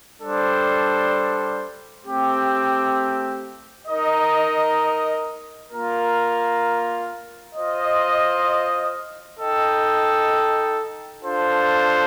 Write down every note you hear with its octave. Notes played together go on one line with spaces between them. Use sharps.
G3 D4 A4 C5
A3 C4 G4
D#4 A#4 D#5
A#3 F4 A#4
F4 C5 D#5
D#4 A4 D#5 G5
D4 F4 A4 C5